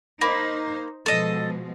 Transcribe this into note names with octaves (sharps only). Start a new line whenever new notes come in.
A#3 D#4 C5 B5
B2 F3 G#3 A4 D#5